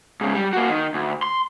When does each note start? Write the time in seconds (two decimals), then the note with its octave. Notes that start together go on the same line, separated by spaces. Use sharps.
0.21 G#2 C#3
0.35 G3
0.53 A#3 F#4
0.70 D#3
0.94 D2
1.23 C6